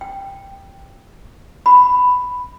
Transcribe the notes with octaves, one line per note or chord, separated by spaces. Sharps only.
G5
B5